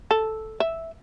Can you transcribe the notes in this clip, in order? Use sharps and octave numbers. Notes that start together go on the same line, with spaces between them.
A4
E5